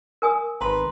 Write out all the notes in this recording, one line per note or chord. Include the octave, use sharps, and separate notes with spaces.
A#4 G#5 D#6
G#1 B4 A#5 C6